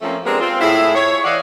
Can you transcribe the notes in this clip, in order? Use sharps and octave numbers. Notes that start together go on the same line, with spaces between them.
F3 A3 A#3 C4 C#4
G#3 B3 C4 D4 G4 A#4
C4 F4
A2 E4 G#4
C#5
E3 D5 D#5 F5 F#5